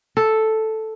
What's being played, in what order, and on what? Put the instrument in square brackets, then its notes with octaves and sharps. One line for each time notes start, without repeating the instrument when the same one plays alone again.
[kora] A4